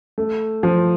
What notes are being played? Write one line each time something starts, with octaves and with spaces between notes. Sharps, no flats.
A3
F3